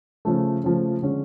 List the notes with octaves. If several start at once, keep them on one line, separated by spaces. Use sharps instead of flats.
C#3 F3 A3
C#3 F3 A3
D3 G#3 C#4